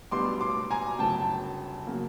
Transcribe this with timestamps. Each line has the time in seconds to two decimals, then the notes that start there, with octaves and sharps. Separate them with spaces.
0.11 B1 B2 G3 B3 D4 C6 D6
0.41 C6 D6
0.70 G#5 A#5
0.99 G1 F#2 C#3 G5 A5
1.87 C#3 F#3 A#3